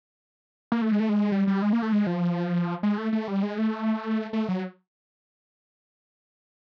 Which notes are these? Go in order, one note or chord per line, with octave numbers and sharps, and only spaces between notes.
A#3
A3
G#3
A3
G#3
G3
G3
G#3
A#3
A3
G#3
F3
G#3
A3
A3
G3
G#3
A3
A3
F#3